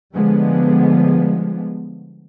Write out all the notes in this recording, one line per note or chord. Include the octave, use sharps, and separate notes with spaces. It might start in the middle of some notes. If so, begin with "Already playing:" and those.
D3 F3 G3 G#3 B3